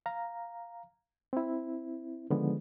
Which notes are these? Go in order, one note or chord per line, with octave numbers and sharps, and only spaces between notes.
F5 A#5
C4 E4
D3 D#3 F3 G#3 B3